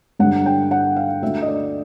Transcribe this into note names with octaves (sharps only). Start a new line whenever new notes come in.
G2 D3 F#5
G5
F#5
F5
D2 D3 E5
D#5
D5